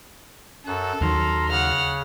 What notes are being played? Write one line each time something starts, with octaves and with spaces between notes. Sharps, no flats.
F#2 A4 F#6
D#2 D#3 F#3 A#5 C6 F6
C#3 F#5 F6